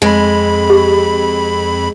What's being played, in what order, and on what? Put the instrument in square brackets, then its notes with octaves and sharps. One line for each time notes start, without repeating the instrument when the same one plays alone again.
[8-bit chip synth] F2 B5 [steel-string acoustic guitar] G#3
[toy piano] G4